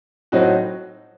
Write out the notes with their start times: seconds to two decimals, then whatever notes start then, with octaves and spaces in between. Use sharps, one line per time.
0.32 A2 F#3 C4 D#4 F#4